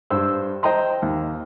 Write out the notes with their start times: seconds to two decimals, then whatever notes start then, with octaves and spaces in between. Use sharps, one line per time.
0.10 G2 C5 E6
0.63 C5 D#5 G5 A#5 C6
1.02 D#2